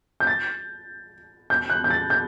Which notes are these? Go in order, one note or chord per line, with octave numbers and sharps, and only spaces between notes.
G6
A6
G6
F#6
G6
A6
G6